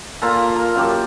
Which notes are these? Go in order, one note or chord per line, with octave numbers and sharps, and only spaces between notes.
A#2 F4 A4 A#5
A#4
F#2 G4 A5